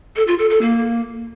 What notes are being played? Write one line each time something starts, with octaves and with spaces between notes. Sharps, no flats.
A4
F4
A4
A4
A#3